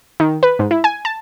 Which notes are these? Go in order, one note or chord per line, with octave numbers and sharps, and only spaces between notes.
D#3
B4
G#2
E4
G#5
A5